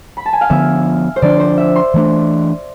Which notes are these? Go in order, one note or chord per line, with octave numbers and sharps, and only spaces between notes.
B5
A5
G#5
F5
D3 F3 B3 D4 E5
C5
D3 F3 B3 D4 D5
C5
E5
C6
E3 A3 D4